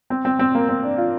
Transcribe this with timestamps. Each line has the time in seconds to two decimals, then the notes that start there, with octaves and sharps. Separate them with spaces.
0.10 C4
0.25 C4
0.39 C4
0.55 A#3
0.69 C4
0.83 D4
0.98 F4